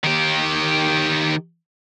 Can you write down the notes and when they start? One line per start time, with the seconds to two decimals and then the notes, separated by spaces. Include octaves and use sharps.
0.04 D#3 G4